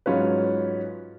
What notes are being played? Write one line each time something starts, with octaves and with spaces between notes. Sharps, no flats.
G#2 F#3 C#4 F4 B4